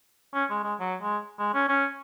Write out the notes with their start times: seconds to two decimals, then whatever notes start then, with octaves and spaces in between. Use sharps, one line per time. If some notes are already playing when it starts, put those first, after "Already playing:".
0.34 C#4
0.50 G#3
0.64 G#3
0.80 F#3
1.02 G#3
1.39 G#3
1.54 C#4
1.69 C#4